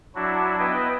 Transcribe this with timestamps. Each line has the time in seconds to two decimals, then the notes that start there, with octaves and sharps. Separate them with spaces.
0.15 F#3 D4 E4 F#4
0.59 B3 E4 B4 D#5 G5